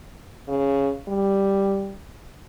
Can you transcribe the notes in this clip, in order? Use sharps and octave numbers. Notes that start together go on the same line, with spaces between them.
C#3
G3